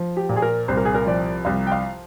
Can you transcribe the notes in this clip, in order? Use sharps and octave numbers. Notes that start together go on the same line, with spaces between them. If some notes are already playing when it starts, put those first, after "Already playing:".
Already playing: F3
G4
A#2
G#4
A#4
C2 C5
A#4
G#4
A#4
F3 D5
C2 F5
G5
F5